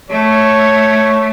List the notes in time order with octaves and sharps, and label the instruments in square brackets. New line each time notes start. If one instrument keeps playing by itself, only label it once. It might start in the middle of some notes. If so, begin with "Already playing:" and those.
[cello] A3 [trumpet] C#5